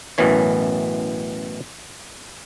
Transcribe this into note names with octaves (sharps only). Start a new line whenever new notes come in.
A1 F#2 B2 E3 C#5